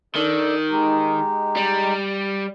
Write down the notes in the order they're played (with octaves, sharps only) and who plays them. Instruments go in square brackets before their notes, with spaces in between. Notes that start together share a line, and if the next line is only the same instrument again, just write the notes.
[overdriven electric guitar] D#3 [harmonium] D4 A4 D5
[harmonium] G#3 D#4 G4
[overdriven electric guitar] G3